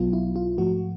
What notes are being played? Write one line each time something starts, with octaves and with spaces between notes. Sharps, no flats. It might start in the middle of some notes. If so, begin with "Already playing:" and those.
Already playing: B1 B2 F#3 B3 F4
E4
F4
G#2 F3 A3 F#4